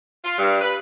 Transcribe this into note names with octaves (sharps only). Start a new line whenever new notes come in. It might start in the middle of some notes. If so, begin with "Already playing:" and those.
F4
G2
B4